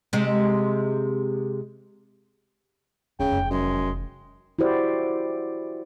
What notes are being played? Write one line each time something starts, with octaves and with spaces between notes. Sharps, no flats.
C3 G#3
D1 C#3 C4 G5
F1 E2
F#2 G#3
E4 F#4 G4 C5 D5